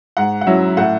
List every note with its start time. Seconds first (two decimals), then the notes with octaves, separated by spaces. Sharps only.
0.17 G#2 F#5
0.41 F#5
0.47 F#3 C#4 E4 E5
0.77 A2 F#5